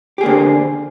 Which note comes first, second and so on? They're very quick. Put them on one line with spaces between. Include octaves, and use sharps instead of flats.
G4 G#4 A#3 D3 C4